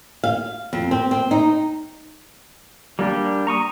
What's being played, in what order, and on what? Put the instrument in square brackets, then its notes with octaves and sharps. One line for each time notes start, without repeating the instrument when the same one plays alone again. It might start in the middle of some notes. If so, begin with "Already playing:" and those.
[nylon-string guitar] F5
F2
C4
C4
D#4
[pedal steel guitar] G3 A#3 D4 G4
A#5 C#6 D#6